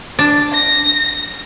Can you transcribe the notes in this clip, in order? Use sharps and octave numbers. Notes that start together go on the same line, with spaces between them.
D4
A#6